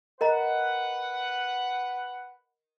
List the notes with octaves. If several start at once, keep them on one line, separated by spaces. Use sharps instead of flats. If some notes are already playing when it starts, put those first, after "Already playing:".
A#4 B4 D#5 F#5 A#5